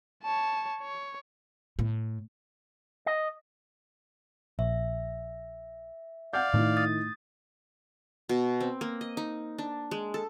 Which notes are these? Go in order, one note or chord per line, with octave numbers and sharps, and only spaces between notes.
C#5 A5
C#5
A2
D#5
A#1 E5
D5 F5 F#5 G6
A2 D#3 A3 E4
D#6 A6
B2
C4
A#3
D#5
D#4
D4
G#3
A4